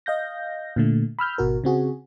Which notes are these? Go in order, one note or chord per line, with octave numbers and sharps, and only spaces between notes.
D#5 F5 G6 A#6
A#2 D3 A3
B5 E6 F6 G6
G#1 B2 F#4 A#4
C#3 C4 F#4 G#4